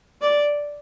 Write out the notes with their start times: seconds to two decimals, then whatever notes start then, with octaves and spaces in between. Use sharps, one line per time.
0.22 D5